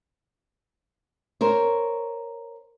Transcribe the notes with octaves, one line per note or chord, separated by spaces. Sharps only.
A#4 C5 C#5